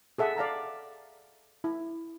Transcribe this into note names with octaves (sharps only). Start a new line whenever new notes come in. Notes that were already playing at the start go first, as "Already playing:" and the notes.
G#4 A4 E5 F#5 D#6
D5 F5 A5 A#5
E4